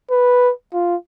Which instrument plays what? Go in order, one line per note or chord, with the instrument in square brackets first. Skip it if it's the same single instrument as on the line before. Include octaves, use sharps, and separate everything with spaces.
[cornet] B4
F4